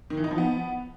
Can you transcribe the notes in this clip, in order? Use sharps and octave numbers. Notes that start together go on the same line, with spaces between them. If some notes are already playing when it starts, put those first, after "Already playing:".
D#3
E3
D#4
F3
B3